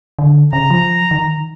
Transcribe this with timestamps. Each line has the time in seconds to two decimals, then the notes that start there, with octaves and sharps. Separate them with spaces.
0.19 D3
0.53 C#3 A#5
0.70 F3
1.11 D#3